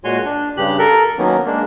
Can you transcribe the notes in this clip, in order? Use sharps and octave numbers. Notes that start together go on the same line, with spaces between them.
A#2 G#3 F#4 C#5 G#5 C6
D4
G2 C#3 G4 F#6
A4 A#4
D#3 F#3 A#3 B3 C#4
G#3 A#3 D4